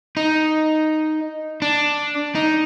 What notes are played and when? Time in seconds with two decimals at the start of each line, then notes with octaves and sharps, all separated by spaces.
0.17 D#4
1.62 D4
2.35 D#4